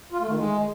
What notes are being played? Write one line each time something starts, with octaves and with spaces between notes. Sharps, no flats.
F4
A3
D#3
G#3